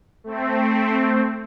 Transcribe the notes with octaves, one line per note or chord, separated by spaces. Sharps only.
A3 C4